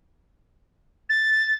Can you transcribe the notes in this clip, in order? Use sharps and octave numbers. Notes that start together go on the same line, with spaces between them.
A6